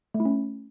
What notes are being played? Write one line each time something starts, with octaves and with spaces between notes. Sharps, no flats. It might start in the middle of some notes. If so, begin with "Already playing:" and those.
A3
E4
C#4